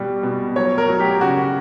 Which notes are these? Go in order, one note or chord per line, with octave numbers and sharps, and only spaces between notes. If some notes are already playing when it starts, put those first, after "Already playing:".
Already playing: B2 G3
B2
F#3 C#5
A#4
F#3
G4
C#3 F#4